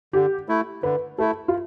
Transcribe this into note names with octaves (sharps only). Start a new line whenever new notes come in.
D3 G4
A3 E4
D3 B4
A3 E4 A4
F4